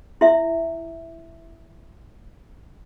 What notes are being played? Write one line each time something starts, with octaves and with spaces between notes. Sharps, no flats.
E4 E5